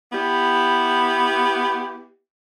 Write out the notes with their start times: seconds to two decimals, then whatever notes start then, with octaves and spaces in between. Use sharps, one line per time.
0.13 B3 E4 G4